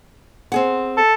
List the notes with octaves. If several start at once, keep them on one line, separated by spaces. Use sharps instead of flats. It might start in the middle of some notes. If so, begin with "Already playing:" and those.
C4 G#4 F#5
A4